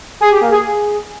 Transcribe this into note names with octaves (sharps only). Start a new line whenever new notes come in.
G#4
G4
A#3
G#4
G#4